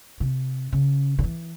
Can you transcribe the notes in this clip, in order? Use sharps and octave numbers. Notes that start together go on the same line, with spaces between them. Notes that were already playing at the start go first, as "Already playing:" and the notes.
C3
C#3
C#3
E3